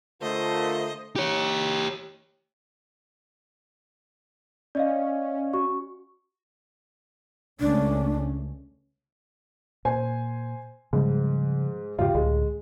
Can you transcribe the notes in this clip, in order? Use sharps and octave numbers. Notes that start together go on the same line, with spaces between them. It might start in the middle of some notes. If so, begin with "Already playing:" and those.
D3 A3 F4 A#4 C5 D#5
G4 C#5
C#4 D5 D#5 F5
F#4 C#6
C#2 A3 C#4 D4
A#2 C5 G#5
G#2 C#3 F3 G3
E2 G#2 C#3 F4 G4
C#2 A2 D3 G#3